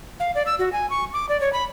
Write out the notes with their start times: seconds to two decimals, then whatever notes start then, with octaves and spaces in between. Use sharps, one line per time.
0.20 F5
0.35 D5
0.46 E6
0.59 F#4
0.73 G#5
0.90 C#6
1.13 D6
1.29 D5
1.41 C#5
1.53 B5